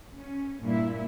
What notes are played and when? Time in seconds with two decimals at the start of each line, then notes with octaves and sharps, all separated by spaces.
0.18 C#4
0.62 G2 A#2 E4